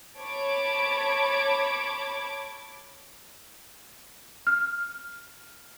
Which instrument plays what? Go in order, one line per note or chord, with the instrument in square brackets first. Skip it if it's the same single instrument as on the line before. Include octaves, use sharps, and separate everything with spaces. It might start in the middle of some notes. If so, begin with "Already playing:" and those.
[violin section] C#5 A5 B5 D6 G#6 D7
[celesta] F6